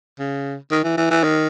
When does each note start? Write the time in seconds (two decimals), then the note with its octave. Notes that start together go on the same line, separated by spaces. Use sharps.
0.19 C#3
0.71 D#3
0.84 E3
0.97 E3
1.11 E3
1.23 D#3